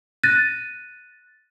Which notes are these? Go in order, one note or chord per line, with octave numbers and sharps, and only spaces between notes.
F#6 A6 A#6 D#7